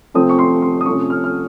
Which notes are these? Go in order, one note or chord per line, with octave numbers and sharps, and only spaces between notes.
C3 F3 A3 C4 D#6
C#6
C6
C6
D#6
C3 F3 A3 C#4 C#6
F6
F6